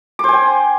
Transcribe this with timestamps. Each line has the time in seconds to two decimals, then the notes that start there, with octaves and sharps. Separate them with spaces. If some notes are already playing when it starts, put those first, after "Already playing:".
0.19 D6
0.24 C5
0.29 G#5
0.33 G5